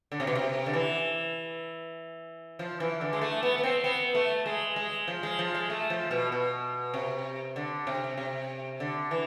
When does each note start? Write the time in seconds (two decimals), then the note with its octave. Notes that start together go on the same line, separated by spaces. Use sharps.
0.12 D3
0.20 C3
0.27 B2
0.35 C3
0.66 D3
0.73 E3
2.59 F3
2.80 E3
3.01 D3
3.13 G#3
3.21 A3
3.43 B3
3.58 B3
3.63 C4
3.84 B3
4.15 A3
4.46 G#3
4.76 G#3
5.08 F3
5.23 G#3
5.39 F3
5.55 G#3
5.70 A3
5.90 F3
6.11 B2
6.32 B2
6.94 C3
7.56 D3
7.87 C3
8.18 C3
8.80 D3
9.11 E3